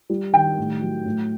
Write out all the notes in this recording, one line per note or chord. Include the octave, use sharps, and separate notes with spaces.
G3
D#3 G5
A2
F#3
A2